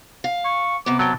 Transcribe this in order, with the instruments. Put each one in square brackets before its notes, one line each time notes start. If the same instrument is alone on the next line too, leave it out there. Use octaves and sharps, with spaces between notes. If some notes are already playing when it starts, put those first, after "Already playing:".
[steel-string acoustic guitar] F5
[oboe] C#6
[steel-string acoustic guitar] C3 B3 [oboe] D6
[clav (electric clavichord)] F#3 G5 [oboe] A5